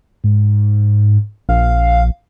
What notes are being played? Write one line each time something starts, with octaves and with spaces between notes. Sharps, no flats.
G#2
A#1 F5